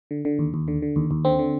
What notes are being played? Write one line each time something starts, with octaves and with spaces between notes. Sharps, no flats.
D3
D3
D#2
D#2
D3
D3
D#2
D#2
D3 C4
D3